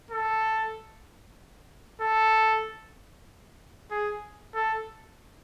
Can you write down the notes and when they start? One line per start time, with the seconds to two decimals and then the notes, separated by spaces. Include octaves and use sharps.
0.11 A4
2.01 A4
3.91 G#4
4.54 A4